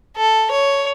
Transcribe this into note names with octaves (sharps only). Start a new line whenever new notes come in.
A4
C#5